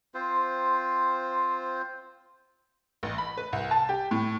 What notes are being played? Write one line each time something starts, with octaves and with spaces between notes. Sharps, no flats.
C4 F4 C5
A1
B5
B4
C2
A5
G4
A2